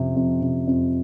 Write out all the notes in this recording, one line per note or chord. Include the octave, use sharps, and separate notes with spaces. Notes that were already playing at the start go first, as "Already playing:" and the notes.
Already playing: F2 C3
F2
C3
F2